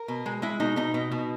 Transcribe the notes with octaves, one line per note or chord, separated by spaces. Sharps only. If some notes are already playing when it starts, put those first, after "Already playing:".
Already playing: A#4
B2
G#3
G#3 E4
B2 D#4
B2 D#4
B2
B2